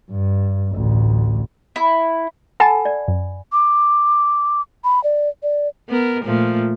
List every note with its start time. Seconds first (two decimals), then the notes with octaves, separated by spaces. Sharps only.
0.10 G2
0.73 A1 D2
1.76 E4
2.60 A4 F#5 G#5 A5 B5
2.85 D5
3.08 F#2
3.53 D6
4.84 B5
5.04 D5
5.43 D5
5.90 B3 A#4
6.25 A#2 F3 A3